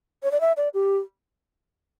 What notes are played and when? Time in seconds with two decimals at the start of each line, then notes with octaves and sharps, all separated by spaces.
0.23 C#5
0.32 D5
0.41 E5
0.57 D5
0.74 G4